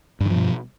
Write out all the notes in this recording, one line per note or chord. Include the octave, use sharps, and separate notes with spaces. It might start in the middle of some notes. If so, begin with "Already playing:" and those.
G2 B2 D#3 F3